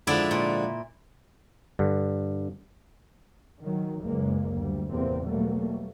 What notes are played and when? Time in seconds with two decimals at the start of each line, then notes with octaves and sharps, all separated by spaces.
0.07 G#2 D3 F3 E4 D5 E5
0.31 A#2
1.79 G2 D3
3.63 D#3 F#3
4.02 F#1 C#2 G#3 A#3
4.52 D2 G3
4.91 E2 A2 C3 A#3 C4
5.24 B2 F#3 G3 A3 A#3